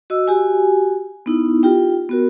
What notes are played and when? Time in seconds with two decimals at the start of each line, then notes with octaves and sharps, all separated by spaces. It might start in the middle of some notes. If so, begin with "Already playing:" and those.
0.10 F#4 D#5 E6
0.28 F#4 G4 G#5
1.26 B3 D#4 E4
1.63 F4 G4 G5
2.09 B3 F#4 A#4